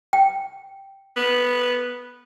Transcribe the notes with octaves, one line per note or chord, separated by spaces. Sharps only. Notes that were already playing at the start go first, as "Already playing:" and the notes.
G5
B3